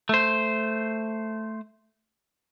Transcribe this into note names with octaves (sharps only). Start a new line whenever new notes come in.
A3 C5